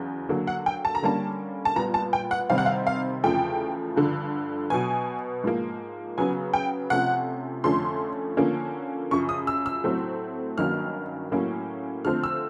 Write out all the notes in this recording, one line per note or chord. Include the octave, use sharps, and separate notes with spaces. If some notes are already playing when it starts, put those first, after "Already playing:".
Already playing: E2 C#3 F#3
D3 F#3 A#3
F#5
G5
A5
A#5
D3 G3 A#3 C#4 A5
A5
A#2 G3 B3 A#5
A5
G5
F#5
C3 D#3 G3 C4 F5
F#5
F5
F5
E2 C#3 F3 A3 G5
G2 D3 F3
B2 F#3 B3 G#5
G#2 F3 A#3
C#3 F#3 B3 G#5
G5
C3 F3 A3 C#4 F#5
F2 D3 F3 A3 C#4 C6
D3 F3 A#3 C#4
F#2 C#3 F3 C#6
D#6
E6
E6
A2 F#3 A3 C4
G2 D#3 F#3 A#3 C#4 F6
A2 F#3 A#3 C#4
D3 F3 A3 C4 F6
E6